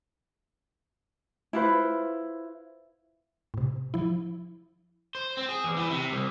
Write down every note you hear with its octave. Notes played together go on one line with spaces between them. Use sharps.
E4 F4 B4 C5
A2 C3
F3 E4
C5
C4
G#4
E2
E3
C3
C2